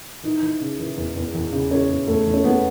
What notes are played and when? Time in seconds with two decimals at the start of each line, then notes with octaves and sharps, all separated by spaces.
0.23 E3 D#4
0.42 E3
0.61 C#3
0.79 E3
0.97 E2
1.16 E2
1.35 E2
1.52 C#3
1.71 E3 C#4
1.90 E2
2.07 E2 A3
2.27 E2
2.34 C#4
2.44 E2 B3